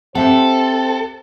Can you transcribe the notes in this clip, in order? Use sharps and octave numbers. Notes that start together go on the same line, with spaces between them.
C4 G4 A4 C5 E5 F#5